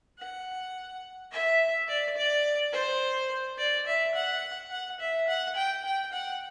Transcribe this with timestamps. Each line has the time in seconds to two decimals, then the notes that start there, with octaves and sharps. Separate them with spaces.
0.19 F#5
1.32 E5
1.88 D5
2.17 D5
2.73 C5
3.57 D5
3.87 E5
4.15 F#5
4.71 F#5
5.00 E5
5.28 F#5
5.56 G5
5.85 G5
6.12 F#5